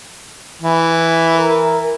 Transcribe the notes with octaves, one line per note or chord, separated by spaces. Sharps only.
E3
A#4